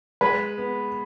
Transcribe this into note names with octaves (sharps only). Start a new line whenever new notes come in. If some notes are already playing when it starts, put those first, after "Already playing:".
G#3 B4
B3